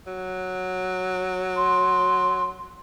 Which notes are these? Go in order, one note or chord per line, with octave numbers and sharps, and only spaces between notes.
F#3
C6